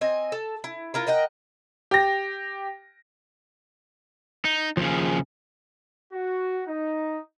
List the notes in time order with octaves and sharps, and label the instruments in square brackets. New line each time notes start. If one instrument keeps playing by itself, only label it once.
[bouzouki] C4 D#5 G#5
A4
E4
E4 F4 A#4
A#4 D#5 F#5 G5
[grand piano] G4 A#6
[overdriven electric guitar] D#4
[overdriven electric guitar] D#2 C#3 [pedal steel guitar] F3 G#4
[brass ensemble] F#4
D#4